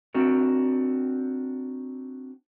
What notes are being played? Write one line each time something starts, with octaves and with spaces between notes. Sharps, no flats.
C4 D4 F#4 A#4